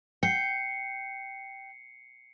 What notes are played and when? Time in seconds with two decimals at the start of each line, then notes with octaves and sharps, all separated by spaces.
0.23 G5 C7 C#7